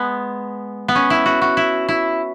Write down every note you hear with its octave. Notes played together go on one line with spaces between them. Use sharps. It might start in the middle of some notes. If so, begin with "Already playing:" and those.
Already playing: G#3 B3
B3
C#4
E4
F#4
F#4
E4
E4